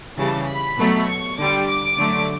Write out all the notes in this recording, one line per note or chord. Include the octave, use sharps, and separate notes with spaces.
C#3 E3 G3 A5
B5
B2 F#3 A3
C#6
D3 G3 D6
D6
D3 F#3 A3